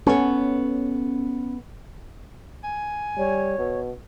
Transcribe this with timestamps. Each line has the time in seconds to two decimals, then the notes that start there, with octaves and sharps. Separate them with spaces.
0.07 B3 C#4 A4 C#5
2.64 G#5
3.18 G3 C#5
3.59 B2